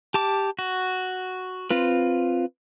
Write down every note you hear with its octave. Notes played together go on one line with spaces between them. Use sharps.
G4 A5 D6
F#4
C4 F4 B4